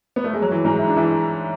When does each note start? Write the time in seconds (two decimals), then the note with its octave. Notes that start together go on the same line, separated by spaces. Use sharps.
0.16 B3
0.24 A3
0.34 G#3
0.42 F#3
0.51 E3
0.64 G#2 G#3
0.79 E4
0.88 D4
0.96 E3 E4